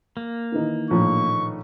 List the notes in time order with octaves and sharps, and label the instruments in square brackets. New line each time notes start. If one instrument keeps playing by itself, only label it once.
[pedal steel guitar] A#3
[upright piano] D#3 E3 D#4
[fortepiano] A#1 A2 [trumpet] C#6